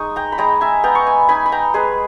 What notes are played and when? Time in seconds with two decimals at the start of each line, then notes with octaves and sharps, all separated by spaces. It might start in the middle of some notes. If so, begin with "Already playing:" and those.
Already playing: G#3 D#4 C#6 D#6
0.16 G5 A#5
0.32 B5
0.38 G#3 G5 A#5
0.61 E5 G#5
0.83 B3 G5 A#5
0.95 C#6
1.06 G#5 B5
1.29 D#4 G#5 B5
1.46 B5
1.52 G5 A#5
1.74 G#3 G#4 B4